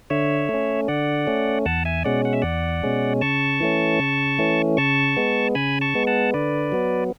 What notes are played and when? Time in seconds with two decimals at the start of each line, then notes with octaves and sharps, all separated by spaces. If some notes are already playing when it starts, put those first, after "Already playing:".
0.10 D3 C#5 E5
0.49 A3 C#4
0.88 D3 D5 F#5
1.27 A3 C#4
1.65 E2 F#5 A5
1.85 E5 G#5
2.04 B2 G#3 C#4 D5 F#5
2.25 F#5
2.33 E5
2.42 E2 D5 F#5
2.83 B2 G#3 C#4
3.21 C#3 A5 C#6
3.60 E3 A3 C#4
4.00 C#3
4.39 E3 A3 C#4
4.77 C#3 A5 C#6
5.16 G#3 B3
5.55 C#3 G#5 B5
5.81 A5 C#6
5.95 G#3 B3
6.07 F#5 A5
6.34 D3 B4 D5
6.72 F#3 B3